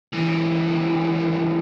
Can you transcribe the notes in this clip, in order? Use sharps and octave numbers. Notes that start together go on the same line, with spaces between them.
C#2 E3